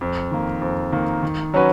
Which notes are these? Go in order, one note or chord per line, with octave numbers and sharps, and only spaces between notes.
F2
D#3 A#3
F2
D#3 A#3
D#3
F#3 C#4 F#4 B4